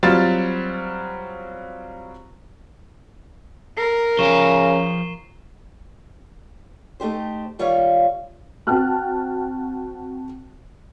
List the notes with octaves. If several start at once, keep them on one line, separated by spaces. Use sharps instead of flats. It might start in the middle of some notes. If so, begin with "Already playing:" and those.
F#3 G3 C4 F4 A6
A#4 C7
C#3 F3 G#4 C#6 E7 G7
A3 D#4 G4 C5
D#3 G3 F4 C#5 E5 F5
C4 F#4 G5 A5 F6 F#6